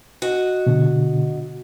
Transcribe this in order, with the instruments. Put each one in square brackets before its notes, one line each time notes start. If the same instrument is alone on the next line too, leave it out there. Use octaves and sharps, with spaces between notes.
[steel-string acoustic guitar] F#4 D#5
[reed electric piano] B2 D3